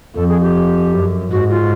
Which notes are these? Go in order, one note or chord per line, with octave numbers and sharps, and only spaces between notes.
F2 A4
G#4
G4
F#2
G#2 F#4
F4